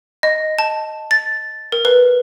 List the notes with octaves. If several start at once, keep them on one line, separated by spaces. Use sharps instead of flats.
D#5
A5
A6
A#4
B4